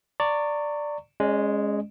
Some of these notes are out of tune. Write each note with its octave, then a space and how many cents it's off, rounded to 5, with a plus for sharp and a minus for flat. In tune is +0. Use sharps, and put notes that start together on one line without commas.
D5 +0 A#5 -35 C#6 +0
G#3 +0 C#4 +0 D5 +45